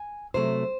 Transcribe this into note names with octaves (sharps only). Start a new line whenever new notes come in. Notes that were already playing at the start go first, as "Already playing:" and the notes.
Already playing: G#5
C3 F#3 A3 C5